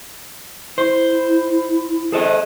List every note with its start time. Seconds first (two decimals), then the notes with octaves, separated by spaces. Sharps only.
0.78 E4 C5
2.12 G#4 A4 C5 D#5